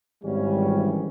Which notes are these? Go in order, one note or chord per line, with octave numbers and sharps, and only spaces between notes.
G#1 E3 G3 C#4